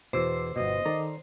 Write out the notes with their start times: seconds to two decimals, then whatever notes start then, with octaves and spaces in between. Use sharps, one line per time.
0.13 E2 B2 C5 D6 E6
0.56 G1 B2 D#5
0.85 D#3 A4 D5 A#5